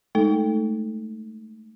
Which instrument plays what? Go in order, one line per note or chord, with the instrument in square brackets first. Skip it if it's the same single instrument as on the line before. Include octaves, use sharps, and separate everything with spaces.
[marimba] G#3 A3 D#4 A4